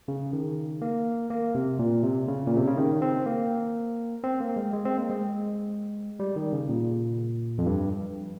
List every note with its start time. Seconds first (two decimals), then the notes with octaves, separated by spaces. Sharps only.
0.08 C#3
0.33 D#3
0.82 A#3
1.30 A#3
1.55 C3
1.79 A#2
2.03 C3
2.28 C#3
2.47 A#2
2.57 C3
2.67 C#3
2.77 D#3
3.02 C4
3.26 A#3
4.24 C4
4.40 A#3
4.57 G#3
4.73 G#3
4.85 C4
4.97 A#3
5.10 G#3
6.20 G3
6.36 D#3
6.53 C#3
6.69 A#2
7.58 F2
7.66 G2